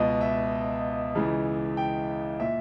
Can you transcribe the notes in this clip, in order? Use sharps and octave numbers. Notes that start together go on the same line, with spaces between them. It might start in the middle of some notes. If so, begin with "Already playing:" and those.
Already playing: C#2 B2 D#5
E5
C#2 C#3 E3
G5
A#2 E5